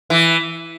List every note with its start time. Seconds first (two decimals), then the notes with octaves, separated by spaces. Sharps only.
0.10 E3